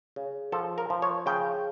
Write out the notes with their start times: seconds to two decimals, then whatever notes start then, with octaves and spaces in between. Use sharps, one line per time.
0.16 C#3
0.52 F3 A4
0.78 A#4
0.90 F3
1.02 C#5
1.26 C#3 G5